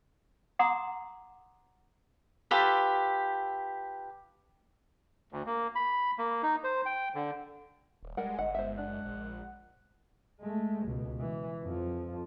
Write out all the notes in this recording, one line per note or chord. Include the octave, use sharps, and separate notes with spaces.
F#5 A#5 C6 D6 D#6
F4 G4 A4 B4
D2
A#3
B5
A#3
D#4
C5
G5
D3
D#1
G3 G#3 A#4 F#5
G1 D#5 F#5
G#3 C5 E5
F#1 D4 F#5
A#1
G#3 A3
C#2 B2
E3
F2 F3